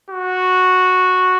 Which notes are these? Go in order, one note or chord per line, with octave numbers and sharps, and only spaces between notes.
F#4